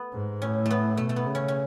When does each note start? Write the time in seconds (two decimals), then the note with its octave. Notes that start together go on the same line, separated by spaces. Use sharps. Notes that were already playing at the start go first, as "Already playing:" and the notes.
Already playing: A3 B3
0.13 G#2
0.42 A2 C#4
0.66 A3 B3
0.97 B2 A3
1.09 A3
1.16 B3
1.26 C#3
1.35 C#4
1.48 C#4